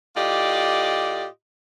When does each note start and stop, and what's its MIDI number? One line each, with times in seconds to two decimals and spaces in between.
0.16 1.26 45
0.16 1.26 65
0.16 1.26 67
0.16 1.26 74
0.16 1.26 75